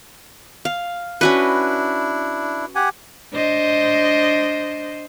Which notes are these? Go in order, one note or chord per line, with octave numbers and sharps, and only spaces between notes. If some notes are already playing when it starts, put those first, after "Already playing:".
F5
C#4 D4 E4 F#4 B4
G4 F#5 G#5
D4 C5 D#5